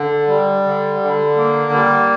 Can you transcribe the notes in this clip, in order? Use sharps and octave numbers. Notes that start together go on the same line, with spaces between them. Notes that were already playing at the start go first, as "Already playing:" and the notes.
Already playing: D3
G3
D3
D3
A#3
G3